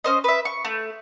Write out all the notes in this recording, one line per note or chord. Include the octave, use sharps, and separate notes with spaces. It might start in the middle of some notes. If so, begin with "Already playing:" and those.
C#4 C5 D#5
B4 E5
C#6
A3